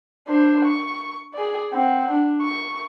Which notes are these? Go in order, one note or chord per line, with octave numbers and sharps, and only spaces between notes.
D4 C5
C#6
G#4 D5
C4 F#5
D4
C#6